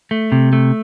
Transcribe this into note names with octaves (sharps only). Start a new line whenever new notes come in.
A3
C3
A3